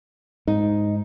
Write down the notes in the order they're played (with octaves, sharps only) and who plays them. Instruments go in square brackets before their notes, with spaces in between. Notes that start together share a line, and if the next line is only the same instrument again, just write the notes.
[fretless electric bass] G#2 [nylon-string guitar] D#4